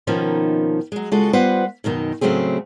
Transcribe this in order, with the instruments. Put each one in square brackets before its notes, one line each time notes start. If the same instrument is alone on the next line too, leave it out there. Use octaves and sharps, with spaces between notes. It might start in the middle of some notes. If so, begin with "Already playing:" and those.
[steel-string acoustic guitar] B2 D#3 F3 A#3 C#4 D#4
F#3 G#3
C#3 G#3 F4 F#4 A4 D#5
G3 B3 F4 B4 C5 F#5
F#2 B2 D#3 D#4
A2 C#3 F#3 A3 C4 G#4